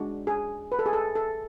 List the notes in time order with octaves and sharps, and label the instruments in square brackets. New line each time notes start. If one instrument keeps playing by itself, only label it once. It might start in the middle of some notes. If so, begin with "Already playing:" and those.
Already playing: [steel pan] G#3 D4 F#4
G#4
B4
A4
G#4
A4
A4